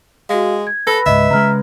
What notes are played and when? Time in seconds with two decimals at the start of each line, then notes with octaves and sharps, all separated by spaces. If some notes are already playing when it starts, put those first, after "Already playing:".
0.29 G#3 F#4 F5
0.67 G#6
0.87 A4 B4 E6 A#6
1.06 C#2 G#2 D#5 E5
1.30 C#3 G3 G#3 A#5 F6